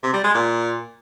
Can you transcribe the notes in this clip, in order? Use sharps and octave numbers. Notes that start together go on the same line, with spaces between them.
C3
G3
G#3
A#2